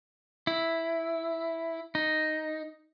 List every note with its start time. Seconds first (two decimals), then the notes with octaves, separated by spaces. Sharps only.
0.47 E4
1.95 D#4